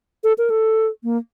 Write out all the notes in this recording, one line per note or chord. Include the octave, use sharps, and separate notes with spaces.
A4
A#4
A4
A#3